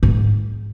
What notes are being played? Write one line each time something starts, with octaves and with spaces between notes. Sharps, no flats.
G#2